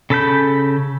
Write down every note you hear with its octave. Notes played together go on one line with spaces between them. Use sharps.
C#3 A4 B5 G6